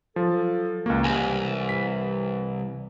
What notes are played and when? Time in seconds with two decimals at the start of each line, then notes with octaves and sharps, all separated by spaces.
0.16 F3 F#3 A4
0.86 C#2 A#3 F#4
1.04 C2 C3 E3 G#5
1.69 B6